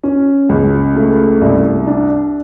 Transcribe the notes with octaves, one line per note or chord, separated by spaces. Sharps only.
C#4
C#2
A3
C2
D4